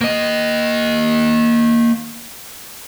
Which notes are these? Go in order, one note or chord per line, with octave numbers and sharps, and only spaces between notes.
A#3 D#5